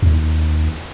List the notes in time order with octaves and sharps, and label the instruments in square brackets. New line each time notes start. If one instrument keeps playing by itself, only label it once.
[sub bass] D#2